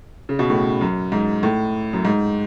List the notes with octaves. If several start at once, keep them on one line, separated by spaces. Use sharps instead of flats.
C#3
B2
A2
F#2
G#2
A2
F#2
G#2